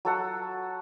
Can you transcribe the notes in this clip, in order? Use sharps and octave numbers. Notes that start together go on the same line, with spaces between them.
F#3 A4 F#5